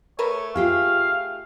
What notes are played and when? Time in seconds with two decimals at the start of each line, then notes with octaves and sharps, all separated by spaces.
0.19 A3 A#4 B4 C#5
0.56 F4 G4 G#4 F5